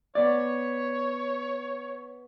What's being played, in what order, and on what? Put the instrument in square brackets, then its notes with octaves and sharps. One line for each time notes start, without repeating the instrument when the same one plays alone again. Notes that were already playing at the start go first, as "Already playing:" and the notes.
[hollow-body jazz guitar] B3 D5 [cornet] C#5